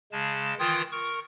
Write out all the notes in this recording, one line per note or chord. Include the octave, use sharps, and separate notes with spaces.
C#3 G#3 A5
D#3 E3 F4 G5 D#6 G#6
A#4 C#6